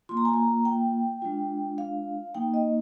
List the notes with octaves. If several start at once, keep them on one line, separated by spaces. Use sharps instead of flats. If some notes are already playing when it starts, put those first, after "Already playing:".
A#3 F4 C6
A#5
G#5
A#5
G5
G#3 D4 F4
F5
A#3 D#4 G5
D#5